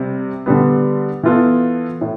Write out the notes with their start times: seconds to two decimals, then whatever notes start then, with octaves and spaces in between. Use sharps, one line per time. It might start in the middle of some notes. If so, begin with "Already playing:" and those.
Already playing: C3 G3 C4
0.46 D3 G3 B3
1.23 E3 B3 F4 A4
2.01 A2